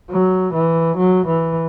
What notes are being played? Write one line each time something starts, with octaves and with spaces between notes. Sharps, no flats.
F#3
E3
F#3
E3